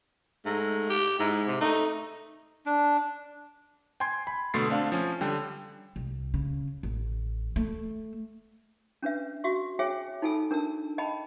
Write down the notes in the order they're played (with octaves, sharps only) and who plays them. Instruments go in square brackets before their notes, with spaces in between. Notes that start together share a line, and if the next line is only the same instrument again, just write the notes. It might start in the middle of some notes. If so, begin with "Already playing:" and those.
[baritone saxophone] G#2 [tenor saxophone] A3
[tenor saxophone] G4
[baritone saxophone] G#2 [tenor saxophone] E4
[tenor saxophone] C3
[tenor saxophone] A3 [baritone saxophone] D#4
[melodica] D4
[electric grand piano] G5 G#5 C6 G#6
B5
B2 D3 A3 C6 A6 C7
A3 C4 D4 F5
F3 C#4
D3 G3 G5
[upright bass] C2
C#3
A1
A3
[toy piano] C#4 D4 B4 E5
F#4 E5 C#6
G#4 C#5 E5 G5 G#5
D#4 F4 A4 G#5 E6
D4 A#4 A5 E6
D#5 G5 A5 B5